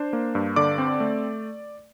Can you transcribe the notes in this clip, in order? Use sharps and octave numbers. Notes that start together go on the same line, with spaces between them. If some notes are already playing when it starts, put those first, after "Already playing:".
Already playing: D4 C5
A#3
G2
D3 D5 D6
C4
A3